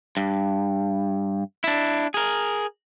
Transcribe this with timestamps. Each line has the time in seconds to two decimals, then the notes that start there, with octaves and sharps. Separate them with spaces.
0.17 G2
1.64 D4 E4
2.14 G#4 A#4